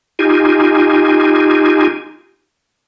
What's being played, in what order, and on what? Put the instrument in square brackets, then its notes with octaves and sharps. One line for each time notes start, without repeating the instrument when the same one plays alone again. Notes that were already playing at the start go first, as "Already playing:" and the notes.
[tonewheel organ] D#4 F4 G4 G#5